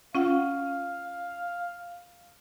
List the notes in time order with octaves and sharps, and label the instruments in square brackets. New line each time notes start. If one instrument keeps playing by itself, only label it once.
[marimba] C#4 F4 F#5 [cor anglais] F5